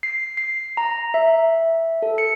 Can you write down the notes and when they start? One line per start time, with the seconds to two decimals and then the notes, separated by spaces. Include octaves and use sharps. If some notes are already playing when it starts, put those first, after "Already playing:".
0.03 C7
0.37 C7
0.77 A#5
1.14 E5
2.02 A4
2.18 C#7